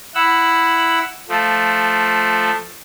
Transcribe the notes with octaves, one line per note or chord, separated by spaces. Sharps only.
E4 F#5 E6
F3 A3